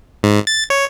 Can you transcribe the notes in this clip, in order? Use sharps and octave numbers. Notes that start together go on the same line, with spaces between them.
G#2
A6
C#5